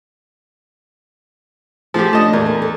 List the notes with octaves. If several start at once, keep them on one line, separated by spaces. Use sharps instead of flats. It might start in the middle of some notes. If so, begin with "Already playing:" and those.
F3 A3 G4 G#4
A3 C#4 D4 D#5 A5
E2 A#2 A3 A#4
A#4
A4